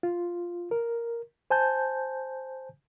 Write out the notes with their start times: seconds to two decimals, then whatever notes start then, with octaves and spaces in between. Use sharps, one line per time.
0.03 F4
0.71 A#4
1.50 C5 G#5 A5 G6